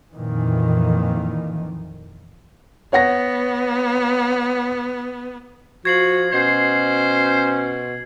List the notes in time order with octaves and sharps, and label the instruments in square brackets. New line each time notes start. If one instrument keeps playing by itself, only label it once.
[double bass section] F2 A#2 D#3 E3
[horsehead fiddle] B3 [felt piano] C#5 F#5 A#6
[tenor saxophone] F3 [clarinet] F#4 [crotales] G#6 C7 F#7
[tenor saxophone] B2 [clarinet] C#4 [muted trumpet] C5